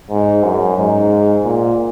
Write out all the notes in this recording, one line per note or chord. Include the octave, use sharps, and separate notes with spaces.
G#2
F#2
G#2
A#2